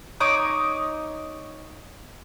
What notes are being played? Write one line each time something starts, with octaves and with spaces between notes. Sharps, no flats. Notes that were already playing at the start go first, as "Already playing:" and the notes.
D#4 C#5 D6 D#6